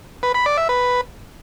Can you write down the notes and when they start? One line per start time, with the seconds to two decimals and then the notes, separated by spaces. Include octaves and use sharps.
0.23 B4
0.34 B5
0.46 D5
0.57 E5
0.69 B4